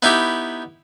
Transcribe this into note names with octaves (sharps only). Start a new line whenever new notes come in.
B3 D#4 E4 G4